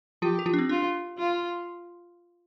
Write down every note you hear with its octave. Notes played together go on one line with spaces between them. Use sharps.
F3 F4 G4
G4
F3 F4
D4
C4
D4 F4
F4